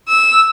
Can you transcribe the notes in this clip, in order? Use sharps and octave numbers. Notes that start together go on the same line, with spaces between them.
E6